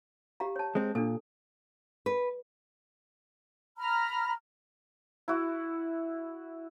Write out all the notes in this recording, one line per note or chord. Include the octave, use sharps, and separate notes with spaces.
G4 F5 A#5
C#5 A5
G#3 C4
A#2 D4 A4
B4
A#5 B5 F6
E4 F#4